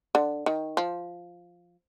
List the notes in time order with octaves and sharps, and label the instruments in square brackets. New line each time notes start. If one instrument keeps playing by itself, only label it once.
[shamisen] D3
D#3
F3